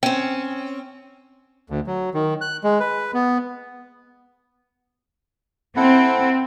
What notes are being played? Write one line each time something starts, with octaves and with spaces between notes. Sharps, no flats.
C4 C#4 G5
D2
F#3
D#3
F#6
G#3
B4
B3
C4 E4 A4 F#5